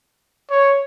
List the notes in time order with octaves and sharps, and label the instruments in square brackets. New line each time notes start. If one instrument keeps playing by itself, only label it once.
[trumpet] C#5